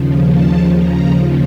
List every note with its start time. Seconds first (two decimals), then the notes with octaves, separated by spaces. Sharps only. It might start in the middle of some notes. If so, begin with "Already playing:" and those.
Already playing: D#2 C#3 F3
0.25 A5
0.75 A#5